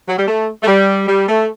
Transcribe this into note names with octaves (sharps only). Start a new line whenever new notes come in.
F#3
G3
A3
A3
G3
G3
A3